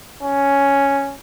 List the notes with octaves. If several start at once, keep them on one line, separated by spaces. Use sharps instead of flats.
C#4